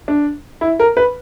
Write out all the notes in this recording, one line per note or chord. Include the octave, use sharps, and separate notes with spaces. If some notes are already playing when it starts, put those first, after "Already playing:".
D4
E4
A#4
B4